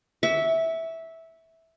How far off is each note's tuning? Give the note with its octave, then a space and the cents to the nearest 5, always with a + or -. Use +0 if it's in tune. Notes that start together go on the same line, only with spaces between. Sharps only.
E5 -10 C#6 +30